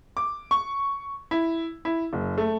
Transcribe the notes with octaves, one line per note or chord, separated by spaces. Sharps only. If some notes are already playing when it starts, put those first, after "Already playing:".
D6
C#6
E4
E4
F#1
A3